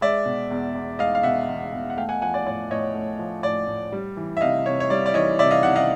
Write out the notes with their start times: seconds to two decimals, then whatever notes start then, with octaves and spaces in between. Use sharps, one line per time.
0.01 G#3 D5 E5
0.26 B2
0.51 E2
0.75 E2
0.99 G#3 D#5 F5
1.15 F5
1.23 B2 E5 F#5
1.49 E2
1.73 E2
1.90 F#5
1.97 A3 F5 G5
2.09 F#5 G#5
2.21 F3 F#5 G#5
2.34 D5
2.46 A2 D5
2.70 A2 C#5 D#5
2.94 A3
3.19 F3
3.43 A2 D5
3.67 A2
3.92 G3
4.17 E3
4.37 E5
4.41 C3 D#5 F5
4.65 C3 C#5
4.80 C#5
4.90 G3 D5
5.06 D5
5.14 E3 C#5 D#5
5.39 C3 D5 E5
5.51 D#5 F5
5.63 C3 E5 F#5
5.75 D#5 F5